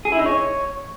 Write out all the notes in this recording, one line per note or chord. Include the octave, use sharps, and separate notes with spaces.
G#4
E4
D#4
C#5